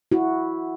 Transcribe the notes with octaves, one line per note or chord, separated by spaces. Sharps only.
E4 F#4